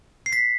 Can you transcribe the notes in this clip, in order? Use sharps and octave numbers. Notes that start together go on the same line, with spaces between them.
C7
B6